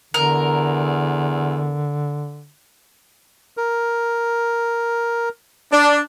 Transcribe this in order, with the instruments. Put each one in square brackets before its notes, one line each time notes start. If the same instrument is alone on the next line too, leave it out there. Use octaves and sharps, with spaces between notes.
[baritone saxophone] E2 [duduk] D3 [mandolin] A#4
[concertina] A#4
[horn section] D4